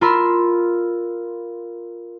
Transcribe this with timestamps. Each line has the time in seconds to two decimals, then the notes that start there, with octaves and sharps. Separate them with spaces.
0.01 F4 A#4 B5 C6 E6